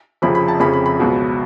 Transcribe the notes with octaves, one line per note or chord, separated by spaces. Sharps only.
F1 F2 C#3 F3 B5
B5
A5
F1 F2 C#3 B5
B5
B5
C#2 B2 F#3